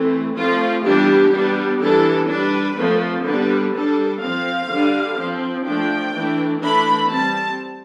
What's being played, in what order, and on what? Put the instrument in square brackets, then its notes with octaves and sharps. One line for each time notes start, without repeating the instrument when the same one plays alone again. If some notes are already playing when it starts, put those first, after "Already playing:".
Already playing: [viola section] E3 A3 C4
F3 A3 C4 F4
E3 G3 B3 D4 G4
G3 B3 D4
E3 G3 B3 D4 A4
G3 D4 B4
F3 A3 C4
D3 G3 B3 D4 B4
G3 D4 A4
F3 C4 F5
D3 G3 D4
F3 C4
F3 A3 D4 G5
E3 A3 D4
E3 A3 D4 B5
G3 C4 A5